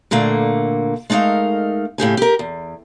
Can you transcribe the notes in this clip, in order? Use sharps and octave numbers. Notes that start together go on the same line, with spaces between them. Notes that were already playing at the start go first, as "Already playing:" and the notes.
A#2 D3 A3 A#3
G#3 A3 D#4 A#4 F5
A2 C#3 G4 G#5
G4 A#4
E2